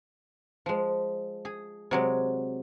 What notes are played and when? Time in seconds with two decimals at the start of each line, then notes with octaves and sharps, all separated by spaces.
0.66 F3 G#3
1.45 G#4
1.91 C3 F#3 G#3